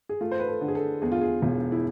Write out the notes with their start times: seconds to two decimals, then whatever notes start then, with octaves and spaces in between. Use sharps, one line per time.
0.09 G#4
0.21 A3 F4
0.31 C5
0.40 B4
0.48 A4
0.61 D3
0.68 G#4
0.75 A4
1.02 E2 G#4
1.12 F4
1.21 G#4
1.42 E1
1.72 E4